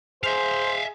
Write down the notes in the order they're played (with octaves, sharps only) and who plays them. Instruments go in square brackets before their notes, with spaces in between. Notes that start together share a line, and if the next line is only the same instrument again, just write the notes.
[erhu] G#4 [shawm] C5 [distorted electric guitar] E5 F5